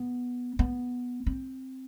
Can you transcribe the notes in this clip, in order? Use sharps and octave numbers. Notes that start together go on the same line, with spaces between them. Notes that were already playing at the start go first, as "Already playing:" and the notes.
Already playing: B3
B3
C4